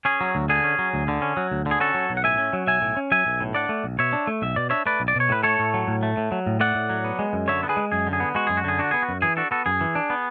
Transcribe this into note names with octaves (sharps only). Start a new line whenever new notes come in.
C#4 G#4
F#3
D2
D3 G#4
C#4
F#3
D2
D3
C#4
F#3
D2
D3
G#4
C#4 F#4 A4
F#3
B1
F#5
A2 E5 G#5
C#4
F#3
B1 E5 G#5
A2
C#4
F#3 E5 G#5
B1
A2
D4 D5 F#5
A3
B1
B2 C#5 E5
D4
A3
B1 E5
B2 D5
D4 C#5 E5
A3 B4 D5
B1
D5
B2 C#5
A2 B4
A3 A4 C#5
A2
F#3
A2
A3
A2
F#3
A2
A3 D5 F#5
A2
F#3
B3
G#3
F#2
D3 C#5 E5
B3
G#4 B4
G#3
F#2 G#4
D3
G#4
B3
G#3 F#4
F#2 G#4
F#4
D3 G#4
D4 F#4
B3 G#4
F#4
F#2
E3 G#4
D4 F#4 A4
B3 F#4 A4
F#2 G#4
E3
D4
B3